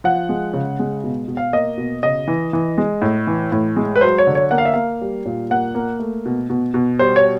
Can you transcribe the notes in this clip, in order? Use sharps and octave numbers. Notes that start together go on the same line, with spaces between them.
F3 F#5
G#3
C#3
G#3
B2
B2
F5
A#3 D#5
B2
C#3 D#5
E3
E3
G#3
A2
E3
A2
G#3
B4
F#3 C5
C#5
D3
C#5
A#3 F#5
F5
E5
A#3 F5
G3
A#2
A#3 F#5
A#3
A3
B2
B2
B2
G3 C5
C#5